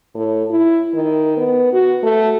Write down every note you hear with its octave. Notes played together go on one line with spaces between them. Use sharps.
A2
E4
D#3
B3
F#4
A3